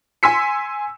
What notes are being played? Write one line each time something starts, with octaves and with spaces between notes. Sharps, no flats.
G#5 C6 E6 B6 C#7